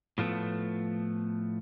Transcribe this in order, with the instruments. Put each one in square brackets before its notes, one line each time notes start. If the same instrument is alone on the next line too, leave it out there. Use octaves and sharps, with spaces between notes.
[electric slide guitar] A2 F3 A3 B3